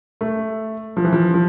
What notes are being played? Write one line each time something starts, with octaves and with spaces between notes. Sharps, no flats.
A3
F3
E3
F3
F3